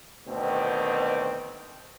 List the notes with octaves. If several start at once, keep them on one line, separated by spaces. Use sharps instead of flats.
D2 B2 D#3 C4